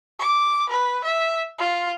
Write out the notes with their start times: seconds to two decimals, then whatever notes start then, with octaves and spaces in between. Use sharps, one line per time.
0.19 D6
0.69 B4
1.04 E5
1.59 F4